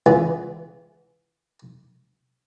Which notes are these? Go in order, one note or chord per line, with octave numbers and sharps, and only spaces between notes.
C#2 E3 B3 G#4